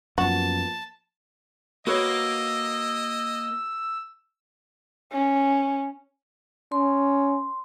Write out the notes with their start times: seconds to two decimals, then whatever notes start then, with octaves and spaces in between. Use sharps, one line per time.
0.18 F#2 F3 A#3 B3 F#4 A5
1.87 A#3 F#4 B4 C#5 D#5 E6
5.13 C#4
6.72 C#4 C6